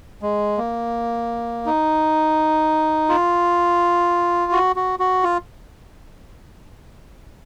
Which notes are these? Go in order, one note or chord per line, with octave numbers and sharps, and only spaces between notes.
G#3
A#3
D#4
F4
F#4
F#4
F#4
F4